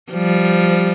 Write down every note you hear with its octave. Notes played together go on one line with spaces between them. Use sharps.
F3 G3